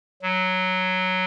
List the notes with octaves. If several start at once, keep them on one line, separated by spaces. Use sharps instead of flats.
F#3